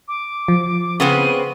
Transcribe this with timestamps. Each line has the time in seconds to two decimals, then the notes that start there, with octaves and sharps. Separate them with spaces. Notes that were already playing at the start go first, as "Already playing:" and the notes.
0.08 D6
0.48 F3
1.00 C#3 B3 C4 D#7